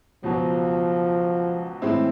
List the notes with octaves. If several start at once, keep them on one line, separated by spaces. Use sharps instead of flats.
C#2 B2 F3 F#3
A2 E3 G#3 C4 E4